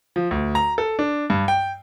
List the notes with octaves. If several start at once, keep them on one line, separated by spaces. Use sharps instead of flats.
F3
D2
A#5
A4
D4
G2
G5